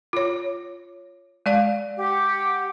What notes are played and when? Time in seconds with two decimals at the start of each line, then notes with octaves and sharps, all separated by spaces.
0.13 F4 C#5
1.46 G#3 D5 F5
1.97 G4 F#5